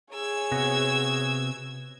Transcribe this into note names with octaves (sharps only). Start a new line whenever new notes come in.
G#4 C#5 E6 G#6
C3 B3 F#4